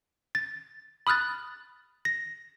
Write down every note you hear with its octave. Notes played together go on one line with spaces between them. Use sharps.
A6
B5 D#6 F6 F#6 A6
A#6